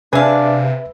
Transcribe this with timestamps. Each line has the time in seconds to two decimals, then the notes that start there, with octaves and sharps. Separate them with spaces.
0.13 C3 D4 G#4 B4 E5 F5